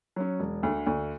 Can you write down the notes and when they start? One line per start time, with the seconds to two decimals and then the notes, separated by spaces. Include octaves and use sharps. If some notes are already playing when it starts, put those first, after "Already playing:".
0.16 F#3 C#4
0.40 E1
0.63 D2 D3
0.87 D2